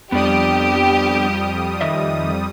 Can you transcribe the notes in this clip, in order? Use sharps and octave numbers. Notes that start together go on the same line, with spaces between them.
F2 G3 B3 D4 G4 D5 D#6
D#3 D#5 E5